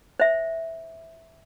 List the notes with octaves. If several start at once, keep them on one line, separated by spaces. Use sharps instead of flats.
C5 E5